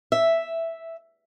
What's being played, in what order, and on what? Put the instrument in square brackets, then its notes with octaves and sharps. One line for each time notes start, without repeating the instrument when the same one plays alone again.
[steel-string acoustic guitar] E5